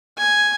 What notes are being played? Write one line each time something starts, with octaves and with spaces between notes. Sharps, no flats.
G#5